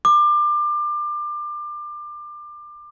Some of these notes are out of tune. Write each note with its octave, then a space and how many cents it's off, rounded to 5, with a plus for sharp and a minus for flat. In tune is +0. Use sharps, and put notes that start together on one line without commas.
D6 +25